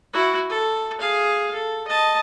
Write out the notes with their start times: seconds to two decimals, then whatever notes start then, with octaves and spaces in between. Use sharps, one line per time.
0.13 E4 F#4
0.49 A4
0.98 G#4 F5
1.53 A4
1.87 D#5 A5